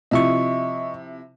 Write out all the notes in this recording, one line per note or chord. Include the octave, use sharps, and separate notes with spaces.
C3 F3 E4 D#5 E5 C#6